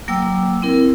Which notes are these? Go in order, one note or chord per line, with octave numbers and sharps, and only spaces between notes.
F#3 A#3 G5 D6 E6
C4 E4 A#4